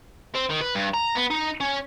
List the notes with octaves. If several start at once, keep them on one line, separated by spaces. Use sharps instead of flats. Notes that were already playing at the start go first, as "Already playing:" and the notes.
C4
D#3
B4
G2
A#5
B3
D#4
C#4